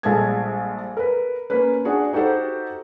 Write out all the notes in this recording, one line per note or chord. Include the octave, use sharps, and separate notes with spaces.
A#1 G3 G#3 A4 A5 G#6
A#4 B4
A#3 C#4 B4
D4 F#4 G#4
D#4 F#4 G4 A4 C5